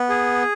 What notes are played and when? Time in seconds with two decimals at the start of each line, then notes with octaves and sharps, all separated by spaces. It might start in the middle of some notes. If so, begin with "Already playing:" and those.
Already playing: B3
0.09 G#4